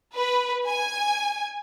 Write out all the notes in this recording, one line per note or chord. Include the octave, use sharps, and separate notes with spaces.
B4
G#5